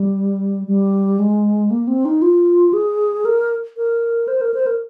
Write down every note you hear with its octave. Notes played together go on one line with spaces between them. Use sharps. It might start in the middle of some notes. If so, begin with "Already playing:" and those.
Already playing: G3
G3
G#3
A#3
C4
D#4
F4
G#4
A#4
A#4
C5
A#4
C5
A#4